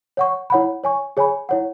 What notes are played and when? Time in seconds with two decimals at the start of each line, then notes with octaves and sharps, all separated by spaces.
0.17 C#5 F#5 C#6
0.50 E4 C#5 F#5 B5
0.84 C#5 G#5 C#6
1.17 G#4 C#5 G#5 B5
1.49 E4 C#5 F#5